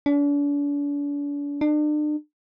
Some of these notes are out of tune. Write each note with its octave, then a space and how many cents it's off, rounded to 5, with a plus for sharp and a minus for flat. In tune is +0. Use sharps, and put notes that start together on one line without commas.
D4 -40
D4 +40